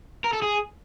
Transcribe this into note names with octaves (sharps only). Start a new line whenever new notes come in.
A#4
A4
G#4